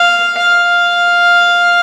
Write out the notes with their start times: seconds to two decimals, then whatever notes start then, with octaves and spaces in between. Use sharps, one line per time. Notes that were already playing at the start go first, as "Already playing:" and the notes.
Already playing: F5
0.38 F5